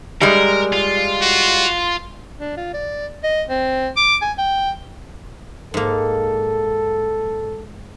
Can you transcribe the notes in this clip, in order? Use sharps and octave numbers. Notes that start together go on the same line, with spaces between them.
G3 G#3 A#4
F4
F#4
D4
F4
D5
D#5
C4
D6
G#5
G5
G#2 A#3 A4